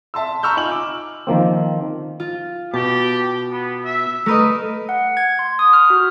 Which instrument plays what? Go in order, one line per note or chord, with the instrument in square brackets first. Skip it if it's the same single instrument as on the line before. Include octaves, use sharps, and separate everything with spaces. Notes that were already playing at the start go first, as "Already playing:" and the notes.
[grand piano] E5 A5 C6 E6
A#5 B5 C#6 E6 F6 G6
D#4 F4 G#5 F#7
D6
[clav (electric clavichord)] D#3 F3 A#3 C4
[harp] F4
[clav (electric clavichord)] B2 [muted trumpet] G4 [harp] A5
[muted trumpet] B3
E5
[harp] A3 B4 D#5 [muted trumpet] A#4
[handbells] F#5
G#6
C6
D#6
F6
F#4